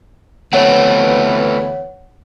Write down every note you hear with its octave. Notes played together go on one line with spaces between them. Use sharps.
D2 E3 A3 B3 C4 C#5 F#5